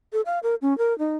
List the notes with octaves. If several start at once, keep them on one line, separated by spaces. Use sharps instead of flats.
A4
F5
A#4
C#4
A#4
D#4